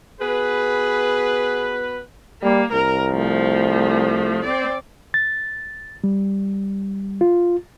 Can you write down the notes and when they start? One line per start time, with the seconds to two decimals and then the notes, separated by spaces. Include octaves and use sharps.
0.20 B3 F#4 G#4 B4
2.43 G3 A#3
2.73 C2 A#4
3.11 F3 A3
4.44 C4 D5
5.14 A6
6.04 G3
7.21 F4